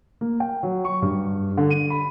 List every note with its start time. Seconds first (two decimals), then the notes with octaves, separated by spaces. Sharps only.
0.21 A#3
0.40 G5
0.63 F#3
0.85 C#6
1.02 G2
1.57 D3
1.70 D#7
1.90 B5